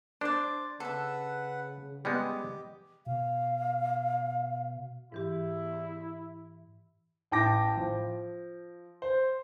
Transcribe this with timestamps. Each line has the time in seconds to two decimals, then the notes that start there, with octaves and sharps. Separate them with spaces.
0.21 D4 C5 D5
0.80 C#3 A4 B4 E5 F#5
2.05 G3 G#3 B3 G4 D#5
3.06 B2 F5
5.12 G#2 E3 E4 G4
7.31 A1 E4 G5 A5 D6 A#6
7.77 F3
9.02 C5